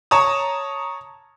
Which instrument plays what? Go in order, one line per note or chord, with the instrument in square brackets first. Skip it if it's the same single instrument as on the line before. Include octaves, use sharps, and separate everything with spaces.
[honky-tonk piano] C#5 A5 A#5 D#6